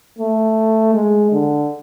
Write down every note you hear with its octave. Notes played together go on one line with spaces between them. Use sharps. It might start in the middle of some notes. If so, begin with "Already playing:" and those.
A3
G#3
D3